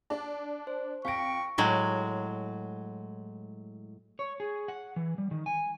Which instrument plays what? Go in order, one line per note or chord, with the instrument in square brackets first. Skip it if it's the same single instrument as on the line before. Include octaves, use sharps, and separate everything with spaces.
[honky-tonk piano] D4 D5
[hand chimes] C5
[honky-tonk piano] F2 D7 [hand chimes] F5 G5 A#6 [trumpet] C#6
[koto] A2 F#3 G#3
[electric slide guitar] C#5
G#4
F#5
E3
G3
D#3
G#5